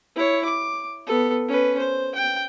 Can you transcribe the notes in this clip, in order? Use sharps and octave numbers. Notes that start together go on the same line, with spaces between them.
E4 C#5
D6
B3 A4
C#4 B4
C5
G5